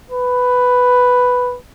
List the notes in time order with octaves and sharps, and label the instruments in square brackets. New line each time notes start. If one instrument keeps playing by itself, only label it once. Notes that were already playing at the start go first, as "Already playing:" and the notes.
[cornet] B4